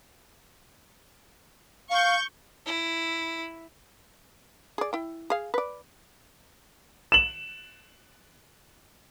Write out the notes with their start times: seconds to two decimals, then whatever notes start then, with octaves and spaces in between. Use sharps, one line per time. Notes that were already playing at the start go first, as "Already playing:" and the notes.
1.90 F5 C#6 G6
2.66 E4
4.78 G#4 D5
4.93 E4 G5
5.30 G#4 F5
5.54 B4 D5
7.12 E7 F#7